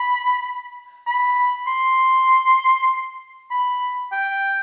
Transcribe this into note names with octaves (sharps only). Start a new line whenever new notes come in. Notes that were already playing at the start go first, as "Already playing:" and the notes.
Already playing: B5
B5
C6
B5
G5